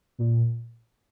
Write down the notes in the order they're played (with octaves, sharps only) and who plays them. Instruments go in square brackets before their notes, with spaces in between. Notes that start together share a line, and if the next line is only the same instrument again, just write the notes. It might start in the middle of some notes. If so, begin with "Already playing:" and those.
[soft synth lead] A#2